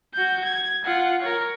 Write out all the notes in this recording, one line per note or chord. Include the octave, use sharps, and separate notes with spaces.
F#4 G6
G#6
F4 F#5
A#4 C#5